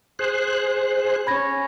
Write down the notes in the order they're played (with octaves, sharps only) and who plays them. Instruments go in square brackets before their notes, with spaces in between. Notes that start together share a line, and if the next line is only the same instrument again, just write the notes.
[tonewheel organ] G#4 C5 F#6
[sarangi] C#4 [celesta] B5 G#6 A#6